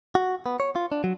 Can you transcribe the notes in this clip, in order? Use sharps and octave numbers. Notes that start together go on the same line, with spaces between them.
F#4
B3
C#5
F4
D4
F#3